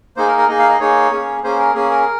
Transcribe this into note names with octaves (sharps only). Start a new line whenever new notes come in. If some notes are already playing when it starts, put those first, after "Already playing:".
A#3 D#4 G#4 C5
A#4
A#4
A#3 D#4 G#4 D#5
F5
D#5
A#3 D#4 G#4 C#5
A#3 C#4 G#4
A#3 C#4 G#4 C5
A#4
A#3 C#4 G#4
A#4